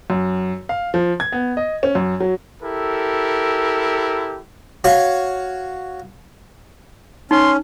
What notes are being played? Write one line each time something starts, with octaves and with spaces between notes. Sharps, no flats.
F#2
F5
F3
G#6
B3
D#5
C#4
F#2
F#3
E4 G4 A4 A#4
F#4 C#5 F5
C#4 D#4 C6